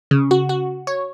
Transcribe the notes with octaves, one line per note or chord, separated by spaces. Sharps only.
C#3
F#4
F#4
C#5